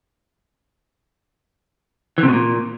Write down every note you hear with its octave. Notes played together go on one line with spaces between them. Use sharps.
E3
C3
B2
A#2